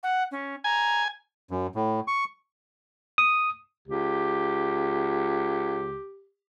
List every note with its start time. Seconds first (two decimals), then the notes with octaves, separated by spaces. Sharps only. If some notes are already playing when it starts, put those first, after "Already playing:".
0.03 F#5
0.31 C#4
0.64 G#5 A#5
1.51 F#2
1.75 A2
2.08 C#6
3.18 D#6
3.88 C#2 G4